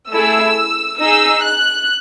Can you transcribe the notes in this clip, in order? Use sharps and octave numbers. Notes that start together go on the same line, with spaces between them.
A3 E4 G#4 E6
D#4 G#4 E6
F#6